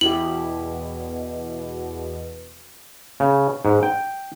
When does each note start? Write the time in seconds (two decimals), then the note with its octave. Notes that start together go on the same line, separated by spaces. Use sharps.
0.01 E2 B2 E4 G4 F#7
3.20 C#3
3.65 G#2
3.83 G5